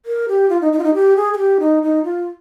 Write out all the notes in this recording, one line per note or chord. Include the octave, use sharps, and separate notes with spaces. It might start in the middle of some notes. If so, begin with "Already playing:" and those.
A#4
G4
F4
D#4
D#4
F4
D#4
G4
G#4
G#4
G4
D#4
D#4
F4